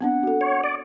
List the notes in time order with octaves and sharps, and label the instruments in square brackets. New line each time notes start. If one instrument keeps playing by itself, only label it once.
[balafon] B3 C4 D4 [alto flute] F#5
[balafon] F#4 A4
[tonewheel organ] C#5
D5